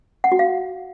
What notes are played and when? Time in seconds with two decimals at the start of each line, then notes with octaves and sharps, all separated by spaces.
0.24 F#5
0.32 F#4
0.39 F5